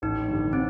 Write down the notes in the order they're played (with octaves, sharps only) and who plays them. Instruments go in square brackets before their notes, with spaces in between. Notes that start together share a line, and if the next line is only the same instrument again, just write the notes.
[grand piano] A1 [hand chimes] D#4
[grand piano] G2 D3 G3
[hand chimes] C4